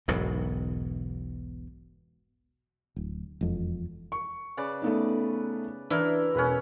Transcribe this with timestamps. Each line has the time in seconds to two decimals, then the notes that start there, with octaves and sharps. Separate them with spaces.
0.08 E1 B1 G#2 B2
2.96 D1
3.41 E1 F2
4.12 C#6
4.57 C#3 B4 D5
4.82 A3 B3 D#4
5.90 E3 D4 E4 A#4
6.35 E1 C#4 B4 B5